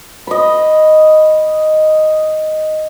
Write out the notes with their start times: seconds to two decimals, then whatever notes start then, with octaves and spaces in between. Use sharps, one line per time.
0.27 D#5 B5